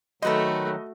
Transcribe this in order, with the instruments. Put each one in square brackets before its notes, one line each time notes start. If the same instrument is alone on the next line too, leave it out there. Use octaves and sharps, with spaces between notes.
[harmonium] D#3 F#3 [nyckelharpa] A3 F#4 [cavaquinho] A4 B4 C5 [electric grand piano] D#5